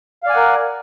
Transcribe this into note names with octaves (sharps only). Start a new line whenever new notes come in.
A#4 D5 F5 F#5 G#5